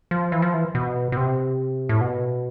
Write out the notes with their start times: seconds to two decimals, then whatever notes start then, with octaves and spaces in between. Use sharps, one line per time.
0.11 F3
0.32 E3
0.42 F3
0.54 E3
0.75 B2
1.12 B2
1.17 C3
1.89 A2
2.01 B2